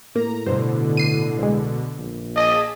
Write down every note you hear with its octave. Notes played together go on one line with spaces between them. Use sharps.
A2 A#3 A#5
G2 B2 D3 C5
C7 D#7
C2 G#3
A#1
G#4 D#5 A5 B6